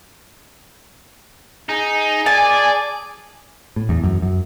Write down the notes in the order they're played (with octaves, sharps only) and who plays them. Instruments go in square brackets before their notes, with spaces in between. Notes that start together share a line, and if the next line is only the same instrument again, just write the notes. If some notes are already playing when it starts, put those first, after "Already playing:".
[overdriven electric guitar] D#4 [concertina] G#4
[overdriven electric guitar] D5 [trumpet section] G#5 [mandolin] A5
[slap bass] A2
E2
F#2
F#2